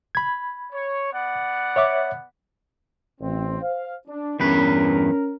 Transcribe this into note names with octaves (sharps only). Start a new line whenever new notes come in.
B5 G#6
C#5
B3 D5 F#5
C#5 E5 D6
A1 C4
C5 F5
D4
E2 G2 C#4 A#4 B4